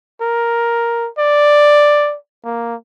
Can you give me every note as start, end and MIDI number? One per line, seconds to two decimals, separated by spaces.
0.21 1.09 70
1.19 2.16 74
2.44 2.75 58